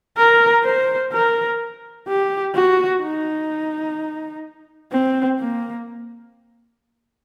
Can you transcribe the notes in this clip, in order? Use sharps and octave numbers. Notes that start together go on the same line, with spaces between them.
A#4
C5
A#4
G4
F#4
D#4
C4
A#3